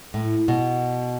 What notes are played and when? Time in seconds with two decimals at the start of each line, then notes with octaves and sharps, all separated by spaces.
0.14 A2
0.48 B2